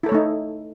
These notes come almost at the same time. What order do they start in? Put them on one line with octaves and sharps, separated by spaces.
E4 A4 C#5 A3 D#4